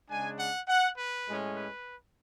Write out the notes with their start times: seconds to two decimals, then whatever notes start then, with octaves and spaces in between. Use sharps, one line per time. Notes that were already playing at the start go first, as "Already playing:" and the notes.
0.10 C#3 G#3 D4 G#5
0.39 F#5
0.68 F#5
0.97 B4
1.27 A2 G#3 C#4
1.56 B4